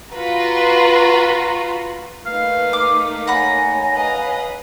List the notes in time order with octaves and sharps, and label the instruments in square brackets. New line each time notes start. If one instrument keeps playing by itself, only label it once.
[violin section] F4 F#4 B4 A#5
[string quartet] A3 A#3 D#4 [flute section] B4 [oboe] F5
[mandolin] D6
[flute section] C#5 G#5 [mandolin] F#5 B5 [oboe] A#5
[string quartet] B4 D#5 F5